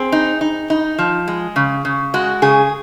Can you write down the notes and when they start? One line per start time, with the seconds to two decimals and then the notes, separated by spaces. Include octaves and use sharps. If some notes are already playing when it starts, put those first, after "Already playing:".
Already playing: C4 G#4
0.12 D#4
0.41 D#4
0.70 D#4
0.98 F3
1.28 G#3
1.56 C#3
1.85 C#3
2.14 G#3 F#4
2.42 C#3 G#4